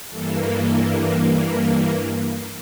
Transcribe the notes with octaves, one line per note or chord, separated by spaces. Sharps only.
G2 E3 A#3 A4
A4
G4